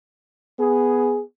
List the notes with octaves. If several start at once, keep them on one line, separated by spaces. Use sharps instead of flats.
B3 G#4